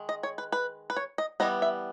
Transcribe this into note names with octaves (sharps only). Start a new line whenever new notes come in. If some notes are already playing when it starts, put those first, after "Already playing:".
Already playing: D#3 G#3
D#5
C#5
B4
B4
B4
C#5
D#5
E3 G3 B3 D#5
E5